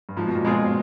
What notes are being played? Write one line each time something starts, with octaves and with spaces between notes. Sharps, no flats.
G2
G#2 F3
B2
A#2
B2 G#3 C4 F4 G#4
A#2